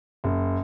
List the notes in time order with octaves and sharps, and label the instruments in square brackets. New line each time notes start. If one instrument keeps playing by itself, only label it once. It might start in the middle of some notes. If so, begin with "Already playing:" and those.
[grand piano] F#1